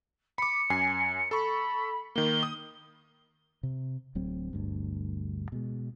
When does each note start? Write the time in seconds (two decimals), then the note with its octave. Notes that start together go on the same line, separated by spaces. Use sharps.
0.38 B5 D6 C#7
0.70 F#2 G#5 C7
1.31 A4 B5 C#6
2.16 D#3 A#3 G7
2.43 D#6
3.63 C3
4.15 D1 D2 F#3 C4
4.53 G1 D2 G2
5.52 B2 G#3